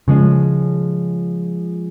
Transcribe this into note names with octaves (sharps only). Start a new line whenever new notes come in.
C#3 F3 G#3 C#4